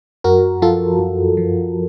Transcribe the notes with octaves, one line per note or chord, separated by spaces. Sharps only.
F#2 F#4 A#4
F3 F4 A4
F#2
F3